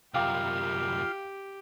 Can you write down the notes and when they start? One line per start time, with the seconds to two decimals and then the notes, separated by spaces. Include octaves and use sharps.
0.14 C2 F#2 F4 G4 F5 G5 D6